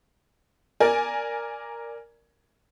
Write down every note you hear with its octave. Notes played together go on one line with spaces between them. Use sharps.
A#4 D5 G#5